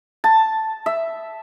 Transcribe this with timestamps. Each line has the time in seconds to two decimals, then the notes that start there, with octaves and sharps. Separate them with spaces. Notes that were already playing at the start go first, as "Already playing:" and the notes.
0.24 A5
0.86 E5